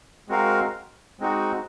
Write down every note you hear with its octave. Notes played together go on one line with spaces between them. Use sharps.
G#3 C4 F#4 A#4 F5
G#3 C4 D#4 F#4